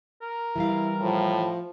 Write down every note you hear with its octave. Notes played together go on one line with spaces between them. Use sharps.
A#4
E3 G3 E4 F5
A2 F3